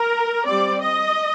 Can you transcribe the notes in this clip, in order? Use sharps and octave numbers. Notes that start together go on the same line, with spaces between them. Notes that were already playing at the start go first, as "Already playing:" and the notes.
Already playing: A#4
G3 C4 D5
D#5